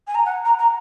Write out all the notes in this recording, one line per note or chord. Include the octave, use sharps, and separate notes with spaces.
G#5
A#5
F#5
A#5
A#5